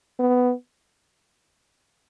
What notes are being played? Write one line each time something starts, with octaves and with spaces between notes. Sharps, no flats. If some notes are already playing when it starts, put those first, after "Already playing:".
B3